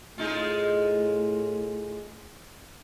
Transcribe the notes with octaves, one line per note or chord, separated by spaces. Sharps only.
A2 G#3 D#4 F4